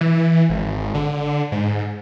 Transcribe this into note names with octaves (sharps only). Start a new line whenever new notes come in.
E3
G#1
D3
G#2